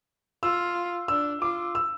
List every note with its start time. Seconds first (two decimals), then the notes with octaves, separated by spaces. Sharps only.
0.43 F4 E6
1.08 D4 E6
1.42 F4 D6
1.75 E6